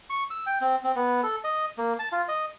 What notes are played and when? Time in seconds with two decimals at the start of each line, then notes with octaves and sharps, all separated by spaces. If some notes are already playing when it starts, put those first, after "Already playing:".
0.10 C#6
0.31 E6
0.46 G5
0.61 C4
0.84 C4
0.96 B3
1.23 A4
1.44 D#5
1.78 A#3
1.99 A5
2.12 F4
2.28 D#5